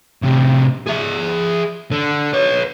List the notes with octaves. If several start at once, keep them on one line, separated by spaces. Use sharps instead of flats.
A2 C3
G#4 E5
D3
B4 C#5